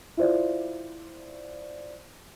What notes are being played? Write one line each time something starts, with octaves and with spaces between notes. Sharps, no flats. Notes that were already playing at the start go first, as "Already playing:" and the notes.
E4 F4 C5 D5